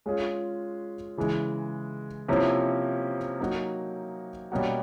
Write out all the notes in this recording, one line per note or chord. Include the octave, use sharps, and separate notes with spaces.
G#3 C#4 F4 G#4
C#3 E3 G#3
C3 F3 A#3 C#4 E4
F#3 A#3 D#4 F#4
B2 G3 A#3 C#4 F#4